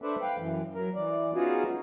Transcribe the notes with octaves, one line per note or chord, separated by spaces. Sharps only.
D4 A4 B4 C5 D5 E5
B4 F5 G5
F#2 E3
F#3 A#4
E3 D5
B3 C#4 D#4 F4 F#4 G#4